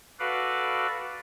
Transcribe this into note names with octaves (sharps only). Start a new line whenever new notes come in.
F#4 A4 B4 D5 F5